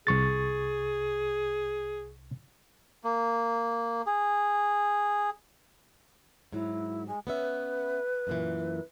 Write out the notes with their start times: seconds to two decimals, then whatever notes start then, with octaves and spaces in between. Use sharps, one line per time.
0.07 C2 G#4 C#6 A6
3.04 A#3
4.06 G#4
6.52 G#2 F#3 E4
7.06 G#3
7.27 B3 C#4 B4 E5
8.27 F#2 A#2 E3